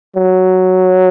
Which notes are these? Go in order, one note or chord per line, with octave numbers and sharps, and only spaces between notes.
F#3